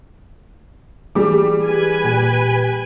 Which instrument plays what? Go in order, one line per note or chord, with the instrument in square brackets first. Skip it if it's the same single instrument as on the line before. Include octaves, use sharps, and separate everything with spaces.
[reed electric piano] E3 G#4 [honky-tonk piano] G3 D6
[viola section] B4 G#5
[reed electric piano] A#2 G4